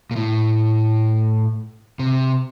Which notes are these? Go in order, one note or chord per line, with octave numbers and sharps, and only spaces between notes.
A#2
A2
C3